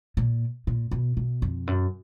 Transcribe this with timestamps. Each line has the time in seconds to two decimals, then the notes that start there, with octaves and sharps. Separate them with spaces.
0.17 A#2
0.67 A#2
0.91 B2
1.17 B2
1.42 F2
1.67 F#2